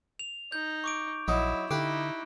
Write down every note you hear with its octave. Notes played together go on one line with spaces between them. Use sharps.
F7
D#4 G6
C#6 D6 D7
A#1 F#3 D#4 E4
D3 D#4 E4 G4 F5 F#6 D7